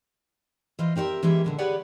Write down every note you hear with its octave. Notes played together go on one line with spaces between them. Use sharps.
E3 F4 C5 D#5
C4 G4 A#4 C#5 E5
E3 G#3 A#3 C#4 G4 E5
A#2 D3 G#3
G4 G#4 B4 C#5 D5 F#5